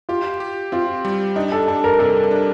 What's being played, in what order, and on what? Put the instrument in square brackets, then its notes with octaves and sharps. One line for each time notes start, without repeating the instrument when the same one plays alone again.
[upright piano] F4 [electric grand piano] G4
[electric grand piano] G4
[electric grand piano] C4 [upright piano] F4
[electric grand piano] G3
[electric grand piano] D4 [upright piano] D#4
[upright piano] A4
[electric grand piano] D4 [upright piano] A4
[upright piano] A#4
[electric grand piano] C3 [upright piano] A4
[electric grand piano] D4